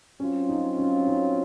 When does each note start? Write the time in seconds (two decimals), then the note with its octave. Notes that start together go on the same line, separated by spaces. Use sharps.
0.20 F#3 C4 C#4 F4
0.49 D#4
0.78 C#4
1.07 D#4